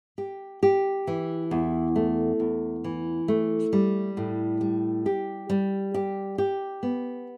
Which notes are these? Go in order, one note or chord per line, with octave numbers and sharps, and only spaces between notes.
G4
G4
E3
E2
A3
E2
E3
A3
G3
A2
G3
G4
G3
G4
G4
B3